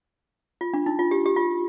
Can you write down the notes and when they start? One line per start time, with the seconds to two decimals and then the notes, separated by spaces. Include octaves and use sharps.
0.61 F4
0.74 D4
0.86 D#4
0.99 F4
1.11 G4
1.26 G4
1.36 F4